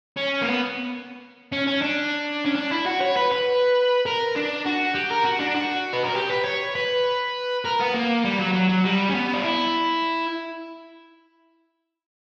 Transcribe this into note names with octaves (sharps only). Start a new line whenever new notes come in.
C#4
A#3
B3
C#4
C#4
D4
C#4
D4
E4
F#4
C#5
B4
B4
A#4
D4
F#4
G4
A#4
F#4
D4
F#4
B4
A#4
G4
B4
C#5
B4
A#4
B3
A#3
G3
F#3
F#3
F#3
G3
C#4
B3
D4
E4